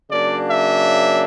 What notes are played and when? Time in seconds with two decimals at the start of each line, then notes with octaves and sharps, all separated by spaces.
0.11 C#3 F#3 A#3 D4 D5
0.50 E5